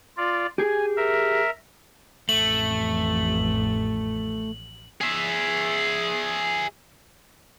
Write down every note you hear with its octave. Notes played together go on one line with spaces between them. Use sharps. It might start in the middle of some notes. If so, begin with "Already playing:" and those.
F4 D5
G4 G#4 G#5
A#4 E5
A1 F2 A3 F#7
G#4 E5